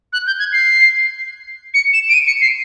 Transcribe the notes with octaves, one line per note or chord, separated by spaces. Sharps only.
F#6
G6
G#6
C7
C#7
E7
D7
D#7
C#7
C7